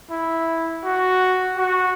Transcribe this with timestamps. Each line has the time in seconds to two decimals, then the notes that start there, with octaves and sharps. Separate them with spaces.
0.11 E4
0.84 F#4
1.57 F#4